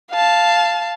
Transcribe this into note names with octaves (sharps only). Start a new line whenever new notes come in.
F5 A5